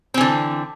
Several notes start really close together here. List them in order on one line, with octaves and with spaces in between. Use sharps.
C4 E3 D3